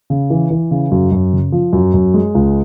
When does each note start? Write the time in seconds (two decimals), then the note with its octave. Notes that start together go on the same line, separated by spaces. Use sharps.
0.10 C#3
0.30 E3
0.51 E3
0.71 C#3
0.91 F#2
1.12 F#2
1.32 C#3
1.52 F3
1.73 F#2
1.94 F#2
2.14 G#3
2.35 C#2